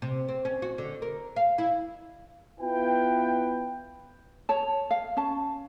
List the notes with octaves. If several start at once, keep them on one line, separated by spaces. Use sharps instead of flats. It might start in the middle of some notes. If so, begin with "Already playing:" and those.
C3
C4
C#4
F#4
D3
A#4
F5
E4
B3 E4 F4 B4 G5
C#5 A5
F5
C#4 A5